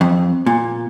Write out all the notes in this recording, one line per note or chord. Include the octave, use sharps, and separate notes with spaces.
F2
A#2